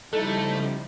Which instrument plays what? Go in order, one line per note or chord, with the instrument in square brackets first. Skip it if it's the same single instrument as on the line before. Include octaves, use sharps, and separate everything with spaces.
[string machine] C#3 F3 G3 [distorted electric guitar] A3 [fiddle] D#4 E4 [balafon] A4